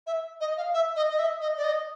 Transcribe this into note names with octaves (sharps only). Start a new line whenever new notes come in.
E5
D#5
F5
E5
D#5
D#5
E5
D#5
D5
D#5